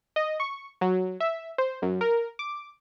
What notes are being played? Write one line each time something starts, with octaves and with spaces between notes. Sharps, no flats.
D#5
C#6
F#3
E5
C5
F#2
A#4
D6